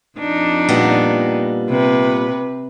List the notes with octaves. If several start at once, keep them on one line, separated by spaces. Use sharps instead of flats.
F2 D4 D#4
A#2 G3 B3
C3 B4